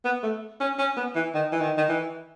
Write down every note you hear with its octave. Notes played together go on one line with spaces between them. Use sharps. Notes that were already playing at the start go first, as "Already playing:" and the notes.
B3
A3
C#4
C#4
B3
E3
D#3
E3
D#3
D#3
E3